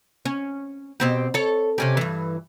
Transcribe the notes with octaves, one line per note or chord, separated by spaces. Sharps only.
C#4
B2 C4 G4
A4 C#5
C3 C#4 G4
G2 E3